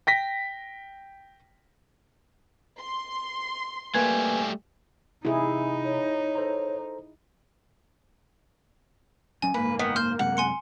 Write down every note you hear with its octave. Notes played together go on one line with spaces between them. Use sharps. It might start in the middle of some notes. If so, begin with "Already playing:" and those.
G5 A#6 B6
C6
G3 A3 A#3 B4 G#5 G#6
C3 D#4 E4 G#4
C#5
A4 C5 A#5
D1 F#3 C#4 G#5
F#1 G#2 A#3 B4
D#3 B3
C5 F6 G6
F#2 C3 G#3 F#5
G#5 C6 C#7